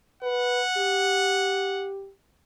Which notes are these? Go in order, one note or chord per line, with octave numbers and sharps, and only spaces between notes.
B4 F#5
G4